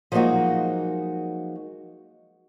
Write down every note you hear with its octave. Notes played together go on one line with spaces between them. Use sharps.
F3 F#3 G#3 A#3 D#4 F#4